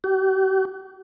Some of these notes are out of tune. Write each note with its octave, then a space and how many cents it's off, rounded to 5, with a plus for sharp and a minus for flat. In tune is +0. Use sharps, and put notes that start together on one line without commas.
G4 -45